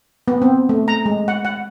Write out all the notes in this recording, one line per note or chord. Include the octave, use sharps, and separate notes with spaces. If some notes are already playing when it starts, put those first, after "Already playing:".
B3
C4
A3
A#5
G#3
F#5
F#5